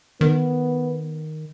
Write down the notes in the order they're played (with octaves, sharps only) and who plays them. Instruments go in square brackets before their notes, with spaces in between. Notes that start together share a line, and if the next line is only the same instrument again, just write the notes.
[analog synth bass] D#3 [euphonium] B3